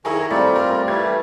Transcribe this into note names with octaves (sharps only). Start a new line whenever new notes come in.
D#3 E4 G#4 A#4 G#5 A#5 C#6
G3 A3 C4 F4 D5
A#4
E3 G3 A3 G4 G#6